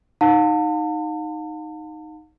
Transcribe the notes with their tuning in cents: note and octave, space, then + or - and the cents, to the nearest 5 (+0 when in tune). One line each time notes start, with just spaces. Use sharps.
D#4 +0 F5 +40 A5 +35